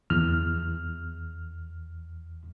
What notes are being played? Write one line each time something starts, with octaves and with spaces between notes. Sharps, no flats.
E2 F6